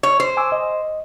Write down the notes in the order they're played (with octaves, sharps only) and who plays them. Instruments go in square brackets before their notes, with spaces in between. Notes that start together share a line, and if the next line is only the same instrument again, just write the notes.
[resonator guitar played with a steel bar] C#5
C5
[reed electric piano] G#5 D6 E6
D#5